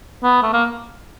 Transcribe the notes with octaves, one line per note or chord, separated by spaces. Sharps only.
B3
A3
A#3